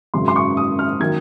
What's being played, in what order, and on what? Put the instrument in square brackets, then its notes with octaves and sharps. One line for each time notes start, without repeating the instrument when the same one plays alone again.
[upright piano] G#1 F#2 C#3 F#3 C6
C6
C#6
D#6
F6
D#3 F#3 A#3 G#6